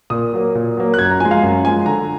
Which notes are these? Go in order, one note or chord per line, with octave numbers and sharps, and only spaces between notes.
A#2 D#6
F#3 A#3
A#2
F#3 A#3
F#6
F#2 G#6
A#5
F3 G#3 G#5
F5
F#2
F3 G#3 G#5
D3 A#5